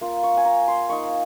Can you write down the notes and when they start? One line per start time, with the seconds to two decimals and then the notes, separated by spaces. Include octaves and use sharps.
0.01 A#3 F4
0.23 C#6
0.37 G#5
0.45 A#5
0.68 C6
0.89 A#3 D#4 C#6